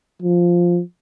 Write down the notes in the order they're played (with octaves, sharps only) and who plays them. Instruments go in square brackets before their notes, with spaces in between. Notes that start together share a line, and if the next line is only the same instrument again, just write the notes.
[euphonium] F3